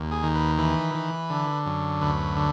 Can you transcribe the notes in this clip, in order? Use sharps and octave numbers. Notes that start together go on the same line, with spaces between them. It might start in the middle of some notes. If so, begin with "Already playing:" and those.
Already playing: D#2
G#4
D#3
B4
E3 B4
E3
D3
F#2
D2 B4
D3